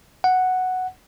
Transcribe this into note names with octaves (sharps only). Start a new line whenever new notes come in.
F#5